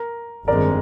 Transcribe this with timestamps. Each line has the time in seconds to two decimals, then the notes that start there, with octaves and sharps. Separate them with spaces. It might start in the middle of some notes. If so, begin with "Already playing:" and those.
Already playing: A#4
0.47 G1 F2 D#3 G#3 C4 A#4 D5